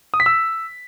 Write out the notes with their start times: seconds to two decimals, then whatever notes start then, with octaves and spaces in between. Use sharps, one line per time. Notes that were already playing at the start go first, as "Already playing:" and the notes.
0.14 D#6
0.20 B6
0.26 E6